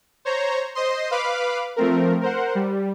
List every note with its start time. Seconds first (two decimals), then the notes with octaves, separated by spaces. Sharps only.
0.25 C5 C#5 A#5
0.75 C5 D#5 C6
1.11 B4 F5 B5 D6
1.76 F3 A3 C4 A#4
2.21 A#4 C5 F#5
2.55 G3